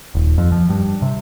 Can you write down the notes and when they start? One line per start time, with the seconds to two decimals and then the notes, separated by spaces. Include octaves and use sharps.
0.15 D#1
0.38 F2
0.52 F3
0.70 G2
1.02 C3